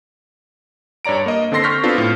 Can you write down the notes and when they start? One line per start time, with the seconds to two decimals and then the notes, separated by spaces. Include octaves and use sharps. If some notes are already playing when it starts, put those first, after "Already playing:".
1.05 G2 C#5 D5 A#5 D7
1.26 A#3 D#5
1.52 D3 C4 A4 C6 A#6 C7
1.64 C#6 F6 G6 A#6 B6
1.83 B3 C4 D4 F4 A4
1.98 A2 F6